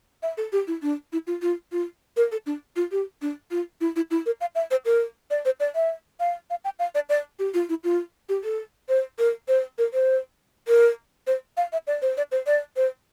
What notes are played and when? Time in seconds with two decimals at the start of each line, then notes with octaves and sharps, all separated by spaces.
0.23 E5
0.37 A4
0.52 G4
0.67 E4
0.82 D4
1.12 E4
1.27 F4
1.42 F4
1.72 F4
2.17 A#4
2.32 A4
2.46 D4
2.76 F4
2.92 G4
3.22 D4
3.51 F4
3.81 E4
3.96 E4
4.11 E4
4.26 A#4
4.41 F5
4.55 E5
4.71 C5
4.85 A#4
5.30 D5
5.45 C5
5.60 D5
5.75 E5
6.20 F5
6.50 F5
6.64 G5
6.79 F5
6.95 D5
7.09 D5
7.39 G4
7.54 F4
7.69 E4
7.84 F4
8.29 G4
8.44 A4
8.89 C5
9.18 A#4
9.48 C5
9.78 A#4
9.93 C5
10.68 A#4
11.27 C5
11.57 F5
11.72 E5
11.87 D5
12.02 C5
12.17 D5
12.32 C5
12.46 D5
12.76 C5